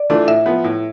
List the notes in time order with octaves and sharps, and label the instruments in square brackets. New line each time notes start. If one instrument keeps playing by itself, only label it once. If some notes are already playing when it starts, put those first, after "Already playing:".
Already playing: [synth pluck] D5
[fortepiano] E3 A3 D4 F4
[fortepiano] A2 [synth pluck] E5
[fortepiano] F3 B3
A2